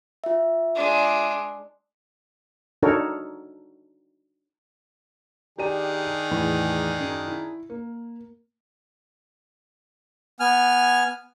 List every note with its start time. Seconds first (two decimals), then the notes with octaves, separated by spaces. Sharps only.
0.24 F4 E5
0.75 G#3 D4
2.83 D4 D#4 F#4 A4 A#4 C#5
5.58 D#3 D4 G4 G#4 D5 D#7
6.31 E2 A2 B5
7.00 F#2
7.27 E4
7.70 A#3
10.40 B3 G#5 F6